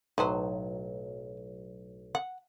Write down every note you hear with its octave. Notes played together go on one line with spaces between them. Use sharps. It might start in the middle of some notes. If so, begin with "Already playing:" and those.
B1 A2 F#3 D#4 B4 C5
F#5